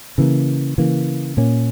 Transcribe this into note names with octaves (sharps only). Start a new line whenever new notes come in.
C#3 E3 A#3
C#3 E3 A#3
A#2 A#3 C#4